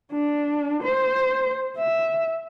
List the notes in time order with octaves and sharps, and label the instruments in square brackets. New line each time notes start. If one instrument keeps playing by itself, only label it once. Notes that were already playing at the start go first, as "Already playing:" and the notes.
[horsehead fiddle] D4
C5
E5